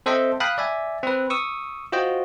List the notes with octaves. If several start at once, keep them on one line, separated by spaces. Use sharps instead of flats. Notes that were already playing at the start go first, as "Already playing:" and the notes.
C4 A4 C5 D#5 E5 G5
F5 G5 A5 B5 D#6 F#6
D5 E5 G#5
C4 B4
C#6 D#6 E6
F4 F#4 C5 D#5 G5